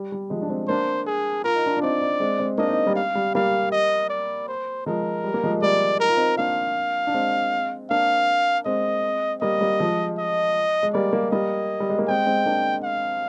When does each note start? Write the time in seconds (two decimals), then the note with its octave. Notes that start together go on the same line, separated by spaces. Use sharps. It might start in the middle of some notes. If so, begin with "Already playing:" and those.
Already playing: G3
0.12 G3
0.30 F3 G#3
0.42 D4
0.49 G#3 C4
0.68 A#3 D4 C5
1.07 G#4
1.44 F4 A#4
1.55 D#4
1.66 D4 F4
1.77 D4
1.82 C4 D#4 D5
2.01 C4 D#4
2.20 G#3 C4
2.39 G#3 C4
2.58 A#3 D4 D#5
2.68 C4 D#4
2.86 G3 A#3
2.96 F5
3.15 G3
3.35 G3 A#3 F5
3.72 D#5
4.10 D5
4.48 C5
4.86 F3 G#3 A#4
5.24 G3
5.34 A#3
5.44 F3 G#3
5.62 G3 A#3 D5
6.00 D#4 A#4
6.08 F4
6.17 C4 D#4
6.38 A#3 D4 F5
7.07 D4
7.14 G#3 C4
7.90 A#3 D4 F5
8.66 G#3 C4 D#5
9.42 G3 A#3 D#5
9.61 G3 A#3
9.80 F3 G#3
10.19 D#5
10.83 G#3
10.94 G3 A#3 D5
11.13 G3 A#3
11.32 G3 A#3 D#5
11.80 G3
11.90 G#3
11.99 A#3
12.08 G#3 C4 G5
12.27 G#3 C4
12.46 A#3 D4
12.84 F5